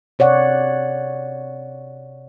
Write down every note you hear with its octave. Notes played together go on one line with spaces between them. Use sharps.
C3 C#5 D5 F#5